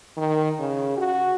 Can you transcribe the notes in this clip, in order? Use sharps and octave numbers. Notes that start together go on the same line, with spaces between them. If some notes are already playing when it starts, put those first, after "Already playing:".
D#3
C#3
F#4